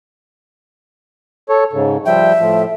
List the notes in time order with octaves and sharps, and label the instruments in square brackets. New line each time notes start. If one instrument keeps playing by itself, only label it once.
[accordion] A4 C#5
G#2 C#3
[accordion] F3 G3 G5 [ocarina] E5
[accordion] A2 F3